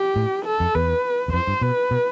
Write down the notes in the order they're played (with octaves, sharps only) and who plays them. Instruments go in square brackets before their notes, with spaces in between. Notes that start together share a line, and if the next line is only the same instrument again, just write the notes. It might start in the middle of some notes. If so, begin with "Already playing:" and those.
Already playing: [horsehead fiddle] G4
[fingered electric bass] A2
[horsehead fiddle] A4
[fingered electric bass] F2
[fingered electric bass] E2 [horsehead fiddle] B4
[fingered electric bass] E2
[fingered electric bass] F2 [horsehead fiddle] C5
[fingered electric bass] G2
[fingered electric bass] B2 [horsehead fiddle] B4
[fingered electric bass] B2